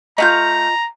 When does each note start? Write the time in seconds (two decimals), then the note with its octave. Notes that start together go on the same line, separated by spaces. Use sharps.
0.18 A3 F4 D#5 F5 A#5 G6